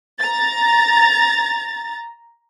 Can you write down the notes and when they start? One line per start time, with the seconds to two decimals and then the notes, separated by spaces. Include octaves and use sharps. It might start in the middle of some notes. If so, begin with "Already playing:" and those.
0.20 A#5 A6